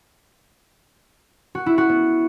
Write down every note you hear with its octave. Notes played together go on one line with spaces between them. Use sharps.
F#4
E4
F#4
B3